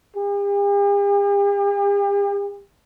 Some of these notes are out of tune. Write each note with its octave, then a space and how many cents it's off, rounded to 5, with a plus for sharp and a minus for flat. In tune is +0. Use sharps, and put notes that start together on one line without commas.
G4 +45